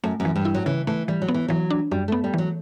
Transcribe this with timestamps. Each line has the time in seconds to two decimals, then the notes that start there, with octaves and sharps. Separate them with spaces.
0.04 F#2 A3
0.20 F#2
0.25 E3
0.36 G2
0.45 E4
0.55 F#3
0.66 C#3 E3
0.87 E3 A3
1.08 E3 G3
1.22 F#3
1.28 B3
1.34 E3
1.48 E3 F#3
1.70 D4
1.91 F#2 G3
2.08 A3 B3
2.24 G3
2.34 E3 F#3